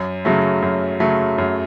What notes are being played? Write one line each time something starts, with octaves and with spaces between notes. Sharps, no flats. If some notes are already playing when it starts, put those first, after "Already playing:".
Already playing: F#2
C#3 F#3 A3
F#2
C#3 F#3 A3
F#2